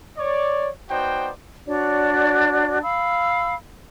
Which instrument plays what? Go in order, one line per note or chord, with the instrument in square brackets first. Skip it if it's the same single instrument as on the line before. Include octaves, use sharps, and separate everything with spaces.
[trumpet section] C#5 D5
B3 D#4 F#4 C5 D5 G5
[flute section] D4 F#4 C#5 D5
F5 B5 E6